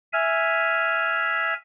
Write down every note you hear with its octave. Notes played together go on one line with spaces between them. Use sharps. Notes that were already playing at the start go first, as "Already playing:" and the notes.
E5 G#5 F6